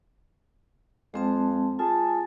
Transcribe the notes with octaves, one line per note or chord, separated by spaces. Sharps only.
F2 G#3 C4 A5
F4 G#4 A5